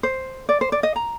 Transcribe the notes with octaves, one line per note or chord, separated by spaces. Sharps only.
C5
D5
C5
D5
D#5
A#5